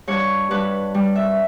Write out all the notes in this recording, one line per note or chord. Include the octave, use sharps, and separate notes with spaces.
G2 C#5
G2 B4
G3
E5